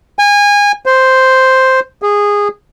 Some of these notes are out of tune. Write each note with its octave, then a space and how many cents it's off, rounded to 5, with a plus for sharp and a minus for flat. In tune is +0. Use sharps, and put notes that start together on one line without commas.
G#5 -25
C5 +0
G#4 -15